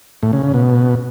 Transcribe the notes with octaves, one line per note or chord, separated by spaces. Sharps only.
A2
C#3
C#3
B2